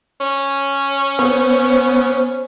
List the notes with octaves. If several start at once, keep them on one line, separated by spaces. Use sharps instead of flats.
C#4
B3 C5